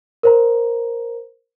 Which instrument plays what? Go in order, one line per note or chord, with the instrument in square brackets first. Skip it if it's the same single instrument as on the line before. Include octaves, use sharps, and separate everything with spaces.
[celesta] A#4 C5 A#5